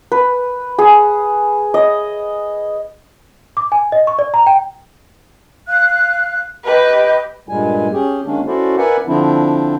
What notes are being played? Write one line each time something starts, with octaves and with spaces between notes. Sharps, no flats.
B4
G#4
D#5
D6
G#5
D#5
C#6
D5
A#5
G5
F5 F#6
G4 B4 D#5 B5
G2 A#2 G3 G#3 G#5
C#4 G4 G#4
D#3 G#3 A#3 C#4 D4
C#4 E4 F#4 A4 C5 D5
A#4 B4 D5 E5 F#5 G#5
D3 F3 C4 D4 E4